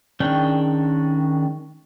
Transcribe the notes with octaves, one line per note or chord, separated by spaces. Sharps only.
D#3 G#3 C#4 D4 G5